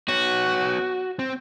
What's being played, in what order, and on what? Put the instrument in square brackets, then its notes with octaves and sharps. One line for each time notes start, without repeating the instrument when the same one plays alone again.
[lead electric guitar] B3 C#5 [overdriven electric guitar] F#4
[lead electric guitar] C4